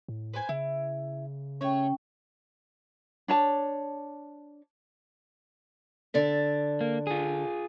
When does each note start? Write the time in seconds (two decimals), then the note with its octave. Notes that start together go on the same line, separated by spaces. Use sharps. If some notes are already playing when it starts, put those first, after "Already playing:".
0.08 A2
0.34 B4 C5 G#5
0.49 C#3 E4
1.61 A3 C#4 C#5 G5
3.28 D4 C#5 A5
6.14 D3 D5 E5
6.81 A#3
7.07 F4 G#4